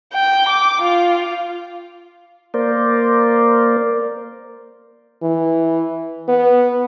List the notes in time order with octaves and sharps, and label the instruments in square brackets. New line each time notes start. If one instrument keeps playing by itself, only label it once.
[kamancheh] G5
D6
F4
[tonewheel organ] A#3 A#4 C5 D5
[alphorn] E3
B3